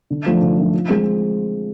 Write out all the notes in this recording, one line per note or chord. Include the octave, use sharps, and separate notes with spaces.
D3
F3 A3 D4
D3
F3 A3 D4
F3
G#3 C4